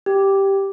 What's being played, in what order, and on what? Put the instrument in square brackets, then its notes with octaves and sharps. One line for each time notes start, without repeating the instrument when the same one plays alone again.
[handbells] G4